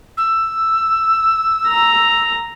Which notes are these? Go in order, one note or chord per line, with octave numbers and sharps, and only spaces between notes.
E6
A#5